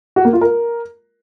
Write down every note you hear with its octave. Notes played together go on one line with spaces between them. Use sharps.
F#4
A#3
F4
A#4